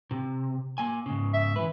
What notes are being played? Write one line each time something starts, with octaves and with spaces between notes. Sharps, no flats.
C3
A#3 G#5
G#2 C#3
E5
E3 B4